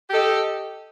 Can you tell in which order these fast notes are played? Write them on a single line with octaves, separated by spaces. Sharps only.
G4 A4 D#5